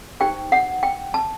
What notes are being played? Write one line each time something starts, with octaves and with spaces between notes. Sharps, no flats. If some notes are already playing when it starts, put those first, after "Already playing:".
D#4 G4 C5 G5
F#5
G5
A5